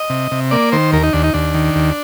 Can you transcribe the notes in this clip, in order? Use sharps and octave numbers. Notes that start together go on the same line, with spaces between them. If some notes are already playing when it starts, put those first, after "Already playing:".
Already playing: D#5
C3
C3
A#3 D5
D#3 C5
D#2 A#4
D#4
D#2 D4
D#4
D#2 D4
D#3
D#2